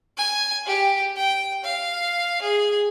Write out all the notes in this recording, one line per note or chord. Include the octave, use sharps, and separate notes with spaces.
G#5
G4
G5
F5
G#4